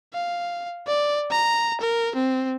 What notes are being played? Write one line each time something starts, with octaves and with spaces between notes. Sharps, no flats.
F5
D5
A#5
A#4
C4